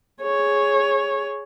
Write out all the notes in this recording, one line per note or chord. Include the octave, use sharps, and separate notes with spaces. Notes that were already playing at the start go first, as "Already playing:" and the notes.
G#4 C#5